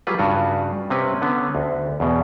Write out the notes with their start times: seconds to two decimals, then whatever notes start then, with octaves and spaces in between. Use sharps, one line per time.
0.07 F#3 G3 F4 G#4 B4
0.19 G2 C#3 F4 F#4
0.90 C3 C4 C#4 B4
1.22 D3 B3 C#4
1.55 D2
2.00 E2 B2